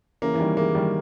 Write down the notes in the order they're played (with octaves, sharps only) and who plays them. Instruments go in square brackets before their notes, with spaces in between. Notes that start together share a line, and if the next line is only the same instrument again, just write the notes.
[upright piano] C#3 E3 [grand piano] A#3
[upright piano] E3
D#3 G3
[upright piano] E3 G#3 [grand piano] A#3
[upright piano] D#3 G3